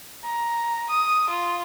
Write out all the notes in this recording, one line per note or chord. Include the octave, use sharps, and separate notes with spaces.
A#5
D#6
F4